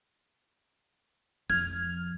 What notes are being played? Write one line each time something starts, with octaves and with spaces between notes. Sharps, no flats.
F2 F6 G#6